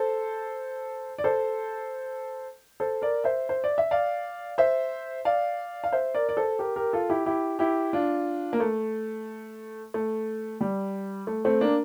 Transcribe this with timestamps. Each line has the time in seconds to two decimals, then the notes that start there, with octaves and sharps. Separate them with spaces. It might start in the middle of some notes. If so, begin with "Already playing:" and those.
Already playing: A4 C5
1.18 D5
1.24 A4 C5
2.80 A4 C5
3.02 A#4 D5
3.24 C5 E5
3.49 C5
3.64 D5
3.78 E5
3.91 D5 F5
4.58 C5 E5
5.25 D5 F5
5.84 F5
5.92 C5 E5
6.15 A#4 D5
6.29 D5
6.37 A4 C5
6.59 G4 A#4
6.76 G4 A#4
6.93 F4 A4
7.10 E4 G4
7.26 E4 G4
7.59 E4 G4
7.93 D4 F4
8.53 A#3
8.60 A3
9.94 A3
10.61 G3
11.27 A3
11.45 A3 C4
11.61 A#3 D4